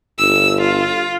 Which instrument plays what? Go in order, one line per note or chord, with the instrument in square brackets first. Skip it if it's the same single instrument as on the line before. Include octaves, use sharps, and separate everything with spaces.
[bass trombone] G1 [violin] E6
[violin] F4